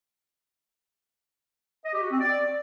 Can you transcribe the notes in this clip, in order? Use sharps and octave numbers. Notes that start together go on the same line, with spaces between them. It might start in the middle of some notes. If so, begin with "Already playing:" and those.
D#5
G4
F#4
C4
D5